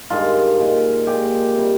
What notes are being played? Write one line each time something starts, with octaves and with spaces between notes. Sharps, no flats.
G2 D#3 G#3 F4
A#2 G#3
A#2 G#3 G4
C3 G3